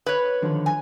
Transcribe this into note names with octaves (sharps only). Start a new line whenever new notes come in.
B4 C#5
D3 D#3 F3
G#5